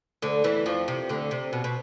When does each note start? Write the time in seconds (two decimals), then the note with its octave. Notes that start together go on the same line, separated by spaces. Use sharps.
0.22 D2 D3
0.44 E2 E3
0.66 F2 F3
0.88 C3
1.09 D2 D3
1.31 C3
1.53 B2
1.64 B2